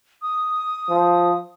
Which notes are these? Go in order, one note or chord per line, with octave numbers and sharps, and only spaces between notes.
D#6
F3